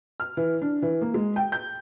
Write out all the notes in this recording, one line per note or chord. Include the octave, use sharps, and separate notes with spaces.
F6
E3
D4
E3
A#3
G#3
G5
G6